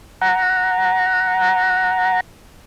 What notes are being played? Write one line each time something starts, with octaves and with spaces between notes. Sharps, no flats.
F#5 A#5